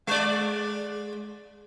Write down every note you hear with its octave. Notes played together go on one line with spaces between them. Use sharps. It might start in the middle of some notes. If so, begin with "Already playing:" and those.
G#3 D5